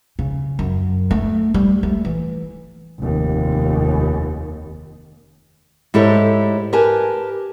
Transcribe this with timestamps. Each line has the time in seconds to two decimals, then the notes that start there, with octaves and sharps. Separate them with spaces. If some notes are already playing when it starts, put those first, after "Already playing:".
0.19 C#3
0.59 F#2
1.11 A3
1.54 G3
1.83 A3
2.05 E3
2.99 F1 D#2
5.94 G#2 E4 G4 A4 C#5
6.73 G4 A#4 B4 G#5 A5